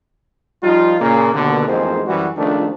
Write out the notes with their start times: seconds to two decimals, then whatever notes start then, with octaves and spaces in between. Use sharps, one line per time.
0.63 F3 G3 D#4 F4
1.00 A#2 C#3 A#3
1.34 D#2 B2 D3
1.68 A1 F2 G#2 G#3 A#3 C5
2.07 F#2 E3 G3 F#4
2.37 C#2 D#3 F3 A3 D4